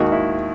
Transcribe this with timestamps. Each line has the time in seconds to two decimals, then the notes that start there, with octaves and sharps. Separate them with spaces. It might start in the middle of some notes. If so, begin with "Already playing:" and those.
Already playing: D#2 D#3 G#3 F#4
0.12 E4